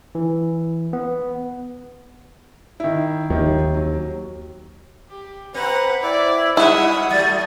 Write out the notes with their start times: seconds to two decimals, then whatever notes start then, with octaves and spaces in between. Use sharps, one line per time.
0.15 E3
0.93 B3
2.80 D#3 E4
3.30 D#2 D#3
3.74 F#3
5.10 G4
5.54 C4 B4 F#5 A#5
6.02 E4 D5
6.57 G3 E4 F#4 E5 F#5 D#6
7.11 F#3 A3 A6